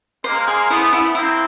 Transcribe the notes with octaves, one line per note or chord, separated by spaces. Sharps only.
G#3 A#3 C5
G#4
A3 B3 E4
E4
A#3 C4 E4